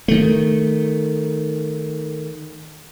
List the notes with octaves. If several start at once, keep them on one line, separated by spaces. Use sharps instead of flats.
D#3 A3